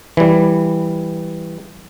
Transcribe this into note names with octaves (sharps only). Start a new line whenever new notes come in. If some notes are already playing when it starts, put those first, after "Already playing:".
E3 G3